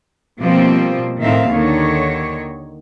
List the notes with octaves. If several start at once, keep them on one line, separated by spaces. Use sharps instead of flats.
B2 F3 G3 A#3 C4
A2 D#3 C4 E5 F5
D#2 D3 D#3 C#5